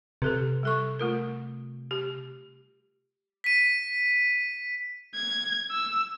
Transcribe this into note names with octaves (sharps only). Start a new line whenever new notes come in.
C3 G4 A4 B4
G3 A4 C#6
A3 F4 A#4
G4
B6 D#7
G#6
E6